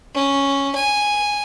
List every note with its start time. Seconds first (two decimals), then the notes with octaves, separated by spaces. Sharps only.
0.14 C#4
0.75 G#5